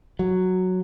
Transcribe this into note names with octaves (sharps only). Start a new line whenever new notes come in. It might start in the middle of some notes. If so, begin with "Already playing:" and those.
F#3